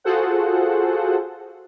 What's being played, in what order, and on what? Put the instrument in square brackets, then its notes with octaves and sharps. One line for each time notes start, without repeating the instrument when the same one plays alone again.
[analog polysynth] F4 F#4 G#4 A4 C5 F#5